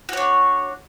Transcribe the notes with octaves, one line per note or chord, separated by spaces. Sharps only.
D4 F#4 C#5